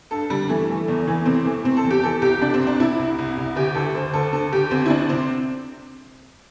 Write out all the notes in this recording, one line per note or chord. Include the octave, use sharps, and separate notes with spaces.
G2 A4
D3 G3
E3 A3
E3
E2
E3
C3 C4
E3 A3
C3 C4
A4
E2
G4
E3 A4
C2 G4
C3 D4
C4
C2
D4
C3 E4
C2
C2
C2
D2 G4
D2 A4
D2 C5
D2 A4
D3 A4
D2 G4
D2 C4
E4
D3 D4
C3 C4